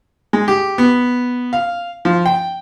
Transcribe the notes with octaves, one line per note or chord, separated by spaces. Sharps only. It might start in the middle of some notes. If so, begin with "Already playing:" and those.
G#3
G4
B3
F5
F3
G5